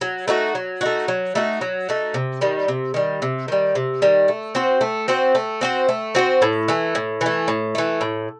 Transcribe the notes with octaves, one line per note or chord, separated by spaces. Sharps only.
F#3
A3 D#4 F#4
F#3
A3 D#4 F#4
F#3
A3 D#4 F#4
F#3
A3 D#4 F#4
C3
D#3 G3
C3
D#3 G3
C3
D#3 G3
C3
D#3 G3
A3
C4 F#4 C5
A3
C4 F#4 C5
A3
C4 F#4 C5
A3
C4 F#4 C5
A2
E3 A3
A2
E3 A3
A2
E3 A3
A2